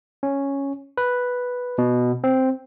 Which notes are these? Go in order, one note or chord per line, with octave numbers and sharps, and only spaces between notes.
C#4
B4
B2
C4